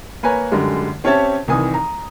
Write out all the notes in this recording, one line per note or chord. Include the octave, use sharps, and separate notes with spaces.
A#3 B4 C#5 G#5 A#5
F#2 D3 G3 G#3
C4 C#4 G4 C#5 E5 A5
C2 D#3 E3 G#5 D#6
A#5